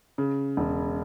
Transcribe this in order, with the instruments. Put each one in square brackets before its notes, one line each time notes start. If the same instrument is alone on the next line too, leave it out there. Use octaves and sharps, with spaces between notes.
[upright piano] C#3
E1